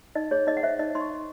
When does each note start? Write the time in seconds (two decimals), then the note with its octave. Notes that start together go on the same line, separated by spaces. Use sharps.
0.15 D#4 D#5
0.31 G#4 C#5
0.47 D#4 D#5
0.57 F#5
0.63 C5 E5
0.79 D#4 D#5
0.95 D#4 C6
1.00 C#6
1.11 D#4